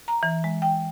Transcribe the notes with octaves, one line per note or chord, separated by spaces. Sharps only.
A#5
E3
G#3
G5